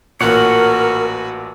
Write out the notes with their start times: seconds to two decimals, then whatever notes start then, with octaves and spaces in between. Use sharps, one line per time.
0.21 A1 A#2 F#4 A#4 B4 C#5 F#5